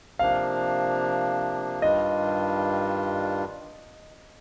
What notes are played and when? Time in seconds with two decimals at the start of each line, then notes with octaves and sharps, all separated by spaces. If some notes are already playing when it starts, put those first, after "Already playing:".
0.19 C3 F3 A#3 D4 F5
1.82 G2 D#3 G3 D4 F4 D#5